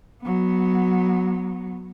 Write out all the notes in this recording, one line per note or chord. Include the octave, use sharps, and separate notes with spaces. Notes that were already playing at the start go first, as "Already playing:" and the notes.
F#3 B3